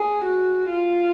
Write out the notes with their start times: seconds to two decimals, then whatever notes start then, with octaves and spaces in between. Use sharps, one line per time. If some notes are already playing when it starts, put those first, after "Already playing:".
Already playing: G#4
0.25 F#4
0.72 F4